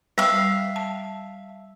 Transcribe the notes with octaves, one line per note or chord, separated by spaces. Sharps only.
G3 E5 F5
A5